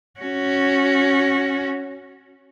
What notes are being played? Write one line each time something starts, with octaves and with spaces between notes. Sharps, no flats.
C#4 F#4